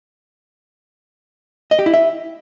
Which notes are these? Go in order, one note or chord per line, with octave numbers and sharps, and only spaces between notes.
D#5
G4
E4
E5